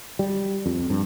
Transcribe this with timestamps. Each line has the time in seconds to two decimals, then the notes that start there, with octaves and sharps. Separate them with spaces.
0.19 G3
0.66 F2
0.90 G2